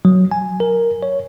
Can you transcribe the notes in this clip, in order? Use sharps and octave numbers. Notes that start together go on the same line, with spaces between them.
F#3
G#5
A#4
C#5